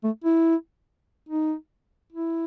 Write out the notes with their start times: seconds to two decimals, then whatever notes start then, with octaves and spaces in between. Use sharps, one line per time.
0.04 A3
0.24 E4
1.29 D#4
2.13 E4